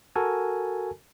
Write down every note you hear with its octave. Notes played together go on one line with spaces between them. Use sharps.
F#4 A4 A#4 G#5 A5